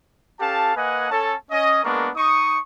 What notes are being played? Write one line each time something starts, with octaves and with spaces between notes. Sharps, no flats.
C#4 G4 A4 F5 A5
A#3 B4 D#5 F#5 G#5
C#4 A4 A5
C#4 D#5
G#3 A#3 B3 D4 A#4 C#6
D#4 C#6 D#6